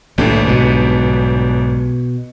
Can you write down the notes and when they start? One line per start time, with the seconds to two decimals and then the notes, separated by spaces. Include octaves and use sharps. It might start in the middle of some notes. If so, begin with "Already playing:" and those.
0.18 G1 C2 A2 D#3 A#3 D4 G4
0.48 B1 G#2 B2